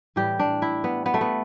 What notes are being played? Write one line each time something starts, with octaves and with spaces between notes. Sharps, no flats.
A2 E3 G3 G4
D4
E4
B3
B3
A3
B3